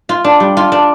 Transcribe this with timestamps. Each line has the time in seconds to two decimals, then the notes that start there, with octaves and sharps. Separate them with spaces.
0.09 F4
0.24 D4
0.40 G3
0.57 F4
0.72 D4